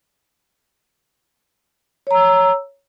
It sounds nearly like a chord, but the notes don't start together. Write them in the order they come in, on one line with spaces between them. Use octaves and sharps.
C#5 A#5 E6